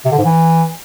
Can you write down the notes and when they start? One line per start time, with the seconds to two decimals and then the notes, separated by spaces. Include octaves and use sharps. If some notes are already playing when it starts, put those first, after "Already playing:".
0.05 C3
0.12 D3
0.18 G#2
0.25 E3